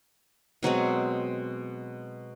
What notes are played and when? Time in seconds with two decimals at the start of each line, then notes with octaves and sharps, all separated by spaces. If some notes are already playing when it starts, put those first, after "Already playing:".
0.63 B2 F#3 G#3 C4